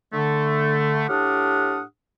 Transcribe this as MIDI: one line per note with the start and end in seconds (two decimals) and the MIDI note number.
0.13 1.04 50
0.13 1.04 57
1.08 1.82 45
1.08 1.82 62
1.08 1.82 67
1.08 1.82 78
1.08 1.82 87
1.08 1.82 89